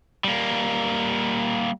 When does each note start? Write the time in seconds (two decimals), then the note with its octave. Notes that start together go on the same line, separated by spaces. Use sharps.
0.24 G3 A#3